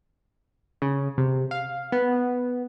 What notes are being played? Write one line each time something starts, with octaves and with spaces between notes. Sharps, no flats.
C#3
C3
F5
B3